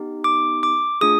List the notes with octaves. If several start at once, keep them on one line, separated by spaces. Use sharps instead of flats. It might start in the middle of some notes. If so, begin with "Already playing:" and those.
Already playing: B3 D#4 G4
D6
D6
A3 D4 F4 G#4 D#6